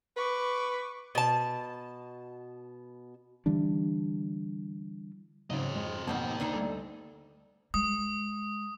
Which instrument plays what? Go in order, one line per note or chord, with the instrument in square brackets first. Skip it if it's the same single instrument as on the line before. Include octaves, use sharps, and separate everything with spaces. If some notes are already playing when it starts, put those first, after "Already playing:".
[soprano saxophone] B4 [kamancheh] C#6 D6
[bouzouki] B2 A5
[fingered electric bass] D3 E3 G3 D4
[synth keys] G#2 C#3 F#3 [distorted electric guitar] C4 D#5
[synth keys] F2 G#3
[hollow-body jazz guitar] F2 G#2 B2 [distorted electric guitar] A#3 G5 [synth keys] A5
[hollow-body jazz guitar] D2 D4 D#4
[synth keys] G3 A4
[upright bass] G#3 [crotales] D#6